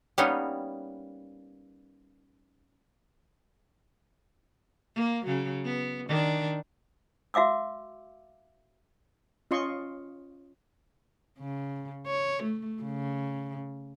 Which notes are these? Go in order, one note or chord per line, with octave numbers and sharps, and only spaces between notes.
G3 A#3 B3 C#4 D#4
A#3
C#3 F#3
B3
D#3 D4
F#4 E5 F5 D6 E6
C#4 F4 D#5 C6 C#6
C#3
C#5
A3
C#3